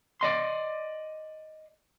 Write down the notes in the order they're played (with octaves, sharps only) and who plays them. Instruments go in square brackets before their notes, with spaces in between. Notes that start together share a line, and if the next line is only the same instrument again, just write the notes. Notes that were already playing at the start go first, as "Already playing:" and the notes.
[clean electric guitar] D5 D#5 C6